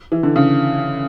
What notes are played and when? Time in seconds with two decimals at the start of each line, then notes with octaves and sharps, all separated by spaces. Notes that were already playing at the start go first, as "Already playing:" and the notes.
0.12 E3
0.23 D3
0.36 C#3